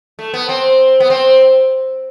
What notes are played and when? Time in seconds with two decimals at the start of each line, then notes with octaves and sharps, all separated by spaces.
0.19 A3
0.34 B3
0.49 C4
1.00 B3
1.10 C4